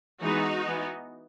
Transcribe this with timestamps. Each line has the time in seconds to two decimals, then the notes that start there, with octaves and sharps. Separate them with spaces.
0.21 E3 G#3 B3 D#4 F#4
0.66 E3 B3